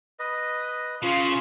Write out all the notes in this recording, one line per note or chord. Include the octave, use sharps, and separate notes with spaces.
B4 D#5
C#3 F4